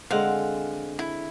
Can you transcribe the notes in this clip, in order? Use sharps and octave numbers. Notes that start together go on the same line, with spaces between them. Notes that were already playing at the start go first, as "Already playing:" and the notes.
D3 G#3 C4 F5 F#5
E4